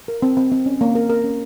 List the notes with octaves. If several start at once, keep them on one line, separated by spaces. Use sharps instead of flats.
A#4
C4
C4
C4
C#4
A#3
A#4
A#4
C#4